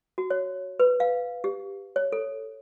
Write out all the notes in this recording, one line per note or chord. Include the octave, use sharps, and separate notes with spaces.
F#4
C#5
B4
F5
G4
C#5
A4